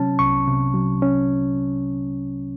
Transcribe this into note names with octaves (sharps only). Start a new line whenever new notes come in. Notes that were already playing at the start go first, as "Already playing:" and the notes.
Already playing: C3 F#3 C#4 A5
C2 C#6
C3
F#3
C#4